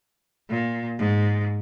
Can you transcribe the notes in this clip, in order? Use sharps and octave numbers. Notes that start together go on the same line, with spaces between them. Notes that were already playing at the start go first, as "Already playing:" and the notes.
A#2
G#2